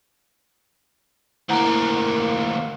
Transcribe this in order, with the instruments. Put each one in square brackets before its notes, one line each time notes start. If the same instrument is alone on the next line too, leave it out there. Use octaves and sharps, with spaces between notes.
[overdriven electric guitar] D2 A#3 [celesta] E4 F#5 A#5